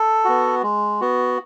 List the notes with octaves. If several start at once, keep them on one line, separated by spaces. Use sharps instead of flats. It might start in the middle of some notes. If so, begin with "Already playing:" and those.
Already playing: A4
B3 F#4
G#3
B3 F#4